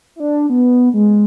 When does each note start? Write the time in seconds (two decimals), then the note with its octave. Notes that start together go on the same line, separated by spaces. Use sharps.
0.16 E4
0.20 D4
0.50 B3
0.94 G#3